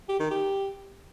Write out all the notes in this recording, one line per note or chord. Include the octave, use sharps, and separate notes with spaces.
G4
D#3
G4